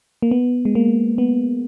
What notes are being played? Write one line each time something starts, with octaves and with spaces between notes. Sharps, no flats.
A#3
B3
G#3
A#3
B3